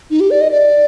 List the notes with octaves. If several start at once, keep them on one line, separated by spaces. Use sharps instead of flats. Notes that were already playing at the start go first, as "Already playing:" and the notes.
D#4
G4
D5
D#5
D5